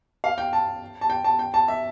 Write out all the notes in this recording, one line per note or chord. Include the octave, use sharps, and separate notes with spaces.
F5
G5
A5
A5
G5
A5
G5
A5
E5